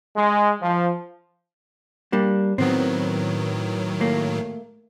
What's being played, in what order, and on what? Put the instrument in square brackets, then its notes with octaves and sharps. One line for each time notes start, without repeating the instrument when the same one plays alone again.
[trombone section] G#3
F3
[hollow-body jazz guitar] G3 A#3 D4
[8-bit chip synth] A2 D#3 F#3 [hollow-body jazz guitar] B3 C4
[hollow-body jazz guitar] A3 A#3